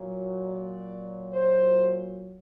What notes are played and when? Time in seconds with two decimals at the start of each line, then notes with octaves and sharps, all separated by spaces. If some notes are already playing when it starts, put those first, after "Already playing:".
Already playing: A#2 F#3
0.47 D5
1.33 C5